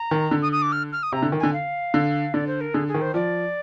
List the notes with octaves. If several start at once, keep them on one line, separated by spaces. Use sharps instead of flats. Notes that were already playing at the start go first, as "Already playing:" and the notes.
Already playing: A#5
D#3
D3
D#6
D#6
D6
F6
F6
D#6
C3 A#5
D3
D#3
D3 G#5
F5
D3
D3 D5
C5
A#4
D3 G#4
G#4
D#3
C5
F3 D5